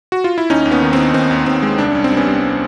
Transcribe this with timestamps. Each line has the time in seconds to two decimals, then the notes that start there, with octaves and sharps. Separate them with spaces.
0.12 F#4
0.24 F4
0.38 E4
0.50 D#2 C#4 D#4
0.66 D#2
0.71 B3 C#4
0.82 D#3
0.93 C4
0.98 D#3
1.14 D#2 C4
1.31 D#2
1.46 D#2 C4
1.62 G#3
1.78 C2 D4
1.92 C2 C#4
2.04 C4
2.11 G3
2.17 B3 C#4
2.27 G3